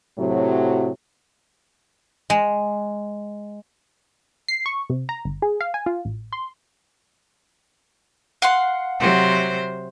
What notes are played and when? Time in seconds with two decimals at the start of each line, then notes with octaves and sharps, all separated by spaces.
0.19 A2 C3 F#3
2.30 G#3
4.48 C7
4.66 C#6
4.90 C3
5.09 A#5
5.25 G1
5.42 G#4
5.61 F5
5.74 G#5
5.86 F4
6.05 A1
6.33 C6
8.42 F5 F#5 C6
9.00 C3 F#3 C5